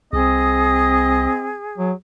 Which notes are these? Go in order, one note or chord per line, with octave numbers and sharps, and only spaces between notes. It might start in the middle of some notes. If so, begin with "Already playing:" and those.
C2 C4 G#4 D#5
F#3